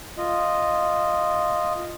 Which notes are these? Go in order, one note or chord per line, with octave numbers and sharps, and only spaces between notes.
F4 D#5